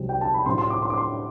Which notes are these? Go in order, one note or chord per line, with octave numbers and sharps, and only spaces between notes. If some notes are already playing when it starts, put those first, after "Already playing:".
Already playing: C2 C3 F#3 C4
G5
A5
B5
A2 F#3 A3 C4 C6
C6
D6
C6
D6
C6